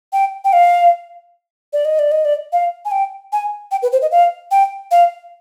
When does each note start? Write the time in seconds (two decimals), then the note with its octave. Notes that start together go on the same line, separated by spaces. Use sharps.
0.13 G5
0.45 G5
0.53 F5
1.73 D5
1.85 D#5
1.99 D5
2.12 D#5
2.25 D5
2.53 F5
2.85 G#5
2.91 G5
3.33 G#5
3.71 G5
3.82 B4
3.92 C5
4.02 D#5
4.12 F5
4.51 G5
4.91 F5